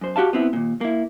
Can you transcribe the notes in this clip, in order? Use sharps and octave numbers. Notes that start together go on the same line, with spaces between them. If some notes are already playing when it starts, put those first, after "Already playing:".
F#2 C5
F#4 G4 F5 A5
B3 C4 E4
D#2 A#2
A#3 E4